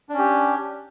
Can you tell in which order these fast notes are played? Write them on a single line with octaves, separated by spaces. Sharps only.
D4 C#4 G4